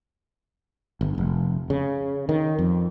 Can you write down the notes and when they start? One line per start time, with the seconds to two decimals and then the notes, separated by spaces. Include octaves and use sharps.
1.01 G1
1.18 F1
1.70 C#3
2.29 D#3
2.59 F2